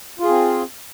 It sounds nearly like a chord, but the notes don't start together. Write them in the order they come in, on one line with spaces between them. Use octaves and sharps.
F4 G#4 C4